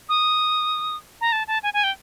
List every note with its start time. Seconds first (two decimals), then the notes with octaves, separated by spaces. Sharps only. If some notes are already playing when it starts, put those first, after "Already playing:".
0.09 D#6
1.21 A#5
1.32 A5
1.48 A5
1.63 G#5
1.74 G#5
1.84 G5